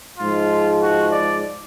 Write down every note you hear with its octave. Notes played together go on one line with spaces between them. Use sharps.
G#2 F3 G#3 F4
F#4
D5